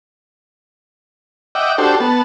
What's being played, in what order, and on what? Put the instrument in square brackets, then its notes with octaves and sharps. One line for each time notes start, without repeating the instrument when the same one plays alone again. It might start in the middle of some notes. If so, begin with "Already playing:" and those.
[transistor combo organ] D#5 E5 F#5 G5 D6
D4 F#4 G4 A4 C5
B3 A5